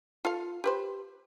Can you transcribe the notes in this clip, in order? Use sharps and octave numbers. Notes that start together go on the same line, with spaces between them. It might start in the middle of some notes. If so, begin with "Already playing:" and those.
F4 A4 F5
G4 B4 C5